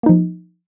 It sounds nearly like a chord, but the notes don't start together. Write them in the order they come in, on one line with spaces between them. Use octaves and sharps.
A#3 D#4 F3